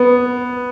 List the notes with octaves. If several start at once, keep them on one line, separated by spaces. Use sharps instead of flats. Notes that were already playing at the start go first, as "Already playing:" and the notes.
Already playing: B3